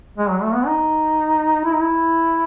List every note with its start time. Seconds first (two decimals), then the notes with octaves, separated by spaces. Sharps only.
0.17 G#3
0.30 F#3
0.42 A3
0.54 B3
0.66 D#4
1.65 E4
1.73 D#4
1.81 E4